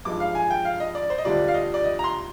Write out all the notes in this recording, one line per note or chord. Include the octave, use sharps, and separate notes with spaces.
G2 F3 G#3 D#4 D6
F5
G#5
G5
F5
D#5
D5
C5
D#5
D2 D3 G3 D4 F4 D5
F5
D#5
D5
D#5
A#5
C6